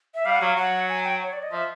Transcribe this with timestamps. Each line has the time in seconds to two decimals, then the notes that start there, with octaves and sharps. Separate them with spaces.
0.15 E5
0.25 G3 F5
0.36 F#5
0.41 F#3 F5
0.57 F#3 F#5
0.89 G#5
1.05 G5
1.23 C#5
1.33 D5
1.43 D#5
1.52 F3 E5